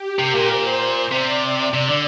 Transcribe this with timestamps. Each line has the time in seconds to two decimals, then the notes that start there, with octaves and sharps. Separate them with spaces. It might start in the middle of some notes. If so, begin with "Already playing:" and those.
Already playing: G4
0.19 C3 A#4
0.35 A#2
0.50 C5
0.80 C5
1.11 C3 D5
1.42 D5
1.74 C3
1.88 D3